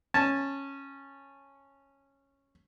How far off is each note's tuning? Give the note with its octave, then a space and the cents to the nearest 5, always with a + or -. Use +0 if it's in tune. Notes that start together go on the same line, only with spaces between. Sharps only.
C#4 -10 A5 +0